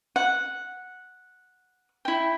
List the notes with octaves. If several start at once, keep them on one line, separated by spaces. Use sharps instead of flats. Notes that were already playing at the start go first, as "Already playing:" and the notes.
F#5
E4 G5